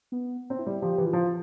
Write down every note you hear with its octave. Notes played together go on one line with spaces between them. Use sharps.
B3
C4
E4
G3
F3 G4
E3
F4
F3